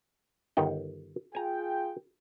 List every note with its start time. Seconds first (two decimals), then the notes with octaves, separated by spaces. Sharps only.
0.57 G1 D#3 G5
1.35 F4 G#4 G5 G#5 A#5